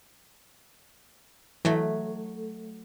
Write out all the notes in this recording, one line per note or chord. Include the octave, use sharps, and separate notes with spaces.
E3 F#3 A3